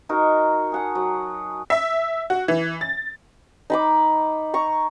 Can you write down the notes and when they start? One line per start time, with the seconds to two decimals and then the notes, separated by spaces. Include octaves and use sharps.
0.09 D#4 F#4 A#4
0.72 G#4 F#5 A5
0.95 F#3
1.70 E5
2.30 F#4
2.48 E3
2.81 A6
3.70 D#4 B5 D6
4.54 A#5 C#6